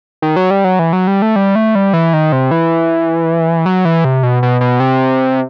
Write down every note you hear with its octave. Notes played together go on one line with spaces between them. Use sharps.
D#3
F#3
G3
F#3
E3
F#3
G3
A3
G3
A3
G3
E3
D#3
C3
E3
F#3
E3
C3
B2
B2
B2
C3